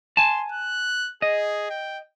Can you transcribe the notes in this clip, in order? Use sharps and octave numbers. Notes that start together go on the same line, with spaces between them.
G#5 A5 C6
F#6
G#4 D#5
G5